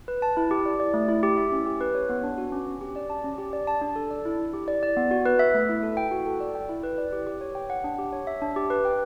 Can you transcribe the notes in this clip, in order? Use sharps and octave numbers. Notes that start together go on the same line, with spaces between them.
B4
A5
E4
G4
D5
D5
A3
E4
G4
E5
C#4
G4
B4
C#5
B3
D4
F#4
C#4
C#4
G4
D5
A5
C#4
G4
D5
A5
D4
A4
D5
E4
E4
G4
D5
D5
B3
F#4
B4
E5
A3
E4
A4
G5
F#4
A4
D5
G5
E4
B4
D5
G4
G4
C#5
G5
F#5
D4
G4
C#5
E5
D4
G4
B4
G5